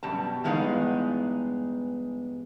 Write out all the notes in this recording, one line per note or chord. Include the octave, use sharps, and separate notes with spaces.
F#2 B2 G3 A5
E2 G2 G#3 B3 D#4 F5